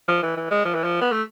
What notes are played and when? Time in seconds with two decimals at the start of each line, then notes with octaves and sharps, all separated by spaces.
0.08 F3
0.22 E3
0.37 E3
0.51 G#3
0.65 F3
0.74 E3
0.84 F3
1.01 B3
1.12 A3